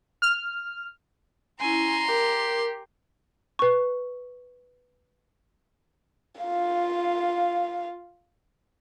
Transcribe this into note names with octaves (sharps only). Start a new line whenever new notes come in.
F6
C#4 E4 G#5 A#5 C6
G4 A#4
B4 C#6
F4 F5